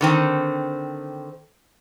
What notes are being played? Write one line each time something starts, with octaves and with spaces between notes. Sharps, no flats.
D3 D#3 C4